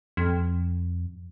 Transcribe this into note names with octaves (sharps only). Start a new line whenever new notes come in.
F2